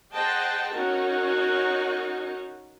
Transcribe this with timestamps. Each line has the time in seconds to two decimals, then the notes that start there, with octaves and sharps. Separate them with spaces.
0.13 G#4 C5 D#5 F#5 G5 A5
0.73 C#4 D#4 F#4 A#4